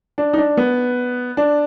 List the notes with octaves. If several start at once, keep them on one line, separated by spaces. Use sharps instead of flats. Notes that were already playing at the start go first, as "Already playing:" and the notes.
D4
D#4
D4
B3
D4